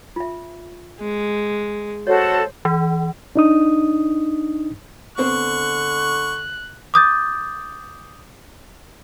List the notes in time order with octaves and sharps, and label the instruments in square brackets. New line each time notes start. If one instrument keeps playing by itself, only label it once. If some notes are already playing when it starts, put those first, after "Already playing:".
[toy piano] F4 E5
[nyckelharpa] G#3
[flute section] F#4 A4 [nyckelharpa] C5 [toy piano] C#5 D#5
[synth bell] E3
[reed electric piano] D4 D#4 D#6
[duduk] D3 [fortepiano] B3 C4 C5 [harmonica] C#6 [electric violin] F#6
[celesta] D6 D#6 G6 A6